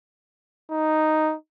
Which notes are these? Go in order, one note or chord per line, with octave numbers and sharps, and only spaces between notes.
D#4